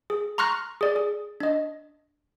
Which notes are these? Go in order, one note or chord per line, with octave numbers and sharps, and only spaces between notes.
G#4
A#5 C6 C#6 F6 F#6 A#6
G#4 D5
G#4
D4 D#5